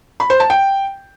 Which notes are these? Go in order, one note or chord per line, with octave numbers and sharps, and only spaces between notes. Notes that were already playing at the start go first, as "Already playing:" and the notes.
B5
C5
A5
G5